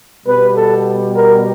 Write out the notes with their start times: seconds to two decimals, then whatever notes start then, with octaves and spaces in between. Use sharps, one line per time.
0.25 B2 G3 B3 B4
0.55 A4
1.15 A#4